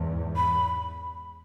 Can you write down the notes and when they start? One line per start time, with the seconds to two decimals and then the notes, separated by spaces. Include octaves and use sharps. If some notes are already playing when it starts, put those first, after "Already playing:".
Already playing: E2 G#2
0.36 B5